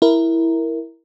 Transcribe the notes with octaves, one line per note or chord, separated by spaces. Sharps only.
E4 A#4